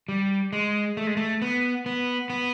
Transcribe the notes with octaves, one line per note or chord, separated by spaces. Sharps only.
G3
G#3
A3
G#3
A3
B3
B3
B3